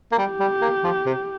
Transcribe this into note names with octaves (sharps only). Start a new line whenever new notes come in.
A#3
G3 G4
G3
A#3
F3
C3